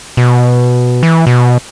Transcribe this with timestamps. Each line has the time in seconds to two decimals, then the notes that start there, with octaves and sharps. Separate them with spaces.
0.17 B2
1.03 E3
1.27 B2